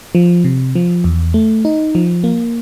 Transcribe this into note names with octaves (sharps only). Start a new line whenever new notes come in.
F3
C3
F3
E2
A3
D#4
F3
A#3